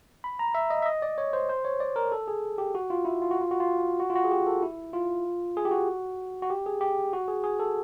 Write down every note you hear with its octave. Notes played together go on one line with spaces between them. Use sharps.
B5
A#5
E5
D#5
E5
D#5
D5
C#5
C5
C5
C#5
D5
A#4
A4
G#4
G4
F#4
F4
E4
F4
F#4
F4
F#4
F4
F#4
F4
F#4
G#4
G4
A4
E4
F4
G#4
G4
F#4
F#4
G4
G#4
G4
F#4
G#4
G#4
A4